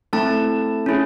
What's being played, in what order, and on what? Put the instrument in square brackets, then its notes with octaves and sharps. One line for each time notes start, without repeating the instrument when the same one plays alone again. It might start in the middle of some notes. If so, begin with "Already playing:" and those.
[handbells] A3 C4 E4 A4 A5
C#4 E4 G#4